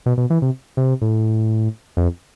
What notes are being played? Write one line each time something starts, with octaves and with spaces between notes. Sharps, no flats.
B2
B2
E3
C3
C3
A2
F2